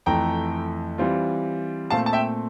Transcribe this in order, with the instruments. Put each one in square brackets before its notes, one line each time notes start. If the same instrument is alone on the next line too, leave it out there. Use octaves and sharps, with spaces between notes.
[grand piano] F2 E3 A3 G5 A#5
E3 G3 C4 F4
A#2 A3 C4 F5 A5
A5
E5 G5